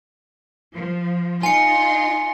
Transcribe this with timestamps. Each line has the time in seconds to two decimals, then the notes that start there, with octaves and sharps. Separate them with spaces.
0.73 F3
1.43 D#4 F4 G#5 C6 C#7